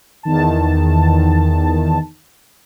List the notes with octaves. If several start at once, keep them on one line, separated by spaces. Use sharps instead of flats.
E2 D#3 A5